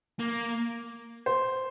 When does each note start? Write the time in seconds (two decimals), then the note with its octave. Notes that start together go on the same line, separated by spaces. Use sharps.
0.19 A#3
1.26 C5